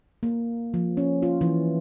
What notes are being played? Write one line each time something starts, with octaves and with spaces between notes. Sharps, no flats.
A#3
F3
C#4
F4
E3